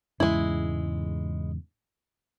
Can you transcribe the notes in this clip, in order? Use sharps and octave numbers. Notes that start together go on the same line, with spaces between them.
E2 G#2 C#3 G#3 E4